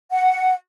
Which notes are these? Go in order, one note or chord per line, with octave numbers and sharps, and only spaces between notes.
F#5